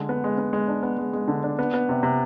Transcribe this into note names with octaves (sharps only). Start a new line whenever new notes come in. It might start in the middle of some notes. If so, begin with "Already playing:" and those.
Already playing: D3 G#3
B3
G#3
B3
G#3
D4
B3
G#3
G#3
D3
D4
B3
B3
C3
C3